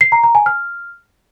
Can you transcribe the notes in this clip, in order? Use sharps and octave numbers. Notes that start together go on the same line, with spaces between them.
C7
A#5
A#5
G#5
F6